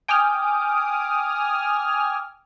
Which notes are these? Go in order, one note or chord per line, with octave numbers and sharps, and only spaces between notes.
G5 G#5 D6 D#6 F6